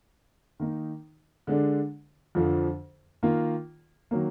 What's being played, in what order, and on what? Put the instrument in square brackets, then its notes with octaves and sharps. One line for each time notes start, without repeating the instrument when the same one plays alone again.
[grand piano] D#3 A#3 D#4
D3 G#3 D4
F2 D3 F3
D#3 A#3 F4
D#3 F#3 A#3